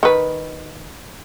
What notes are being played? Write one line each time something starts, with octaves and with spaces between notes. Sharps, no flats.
D#3 B4